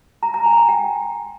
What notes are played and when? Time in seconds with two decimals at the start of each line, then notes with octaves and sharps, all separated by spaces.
0.23 A#5
0.34 A#5
0.46 G#5
0.57 C6
0.69 G5